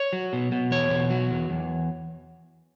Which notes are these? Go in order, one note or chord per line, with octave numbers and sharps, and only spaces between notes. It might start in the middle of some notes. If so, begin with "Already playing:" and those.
Already playing: C#5
F#3
B2
B2
E2 C#5
B2
F#3
E2
E2